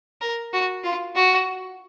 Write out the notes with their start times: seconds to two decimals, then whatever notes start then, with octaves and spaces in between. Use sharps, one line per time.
0.21 A#4
0.53 F#4
0.84 F4
1.16 F#4